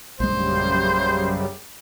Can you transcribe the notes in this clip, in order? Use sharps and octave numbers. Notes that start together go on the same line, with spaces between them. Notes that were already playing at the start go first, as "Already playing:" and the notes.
A#1 F#2 C#3 G3 G#3 C5